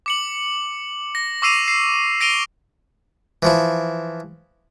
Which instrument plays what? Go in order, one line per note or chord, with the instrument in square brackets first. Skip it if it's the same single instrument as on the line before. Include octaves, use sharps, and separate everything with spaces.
[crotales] D6 C#7 F#7
A#6
C#6 D6 E6 C7 D#7 F7
C7
A#6 C7 D7 D#7 F7 G7
[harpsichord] E3 F3 E4